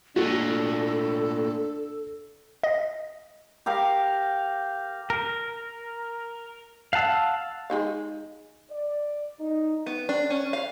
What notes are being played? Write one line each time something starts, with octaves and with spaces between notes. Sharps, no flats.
A#2 A3 D4 F#4 A4
D#5
G4 A#4 F5
A#4
F5 F#5 A5 E6
G#3 D#4 F5
D5
D#4
B3
D4
C#4
F5